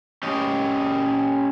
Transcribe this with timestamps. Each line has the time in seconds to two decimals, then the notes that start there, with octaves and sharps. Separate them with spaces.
0.23 C#4 G4 D#5